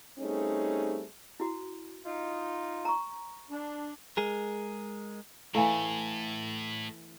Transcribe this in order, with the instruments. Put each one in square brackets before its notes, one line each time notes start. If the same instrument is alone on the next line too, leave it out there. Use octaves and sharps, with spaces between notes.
[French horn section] G3 A3 C4 C#4 D#4 G#4
[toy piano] E4 F#4
[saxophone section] D#4 F4
[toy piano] A#5 C#6
[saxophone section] D4
[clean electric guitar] G#3 G#4 A#4
[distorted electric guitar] A2 [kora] E3 A3 [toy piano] E4 F5 G#5